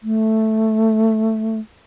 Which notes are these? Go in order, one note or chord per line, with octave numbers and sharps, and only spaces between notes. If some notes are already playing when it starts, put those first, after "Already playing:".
A3